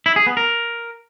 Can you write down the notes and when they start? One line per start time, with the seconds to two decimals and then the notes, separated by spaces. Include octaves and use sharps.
0.06 E4
0.16 G#4
0.27 B3
0.37 A#4